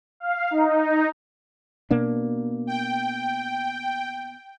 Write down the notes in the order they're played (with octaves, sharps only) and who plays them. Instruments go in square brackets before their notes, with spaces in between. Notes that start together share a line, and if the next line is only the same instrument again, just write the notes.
[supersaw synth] F5
D#4
[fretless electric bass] B2 A#3 D4
[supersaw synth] G5